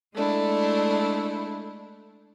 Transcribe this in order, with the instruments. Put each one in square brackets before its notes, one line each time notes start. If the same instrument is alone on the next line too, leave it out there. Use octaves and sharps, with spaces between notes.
[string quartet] G#3 A3 D4 E4